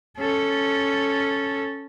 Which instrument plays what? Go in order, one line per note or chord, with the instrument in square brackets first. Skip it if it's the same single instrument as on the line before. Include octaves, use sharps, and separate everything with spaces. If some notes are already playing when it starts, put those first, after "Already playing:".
[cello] C#4 A4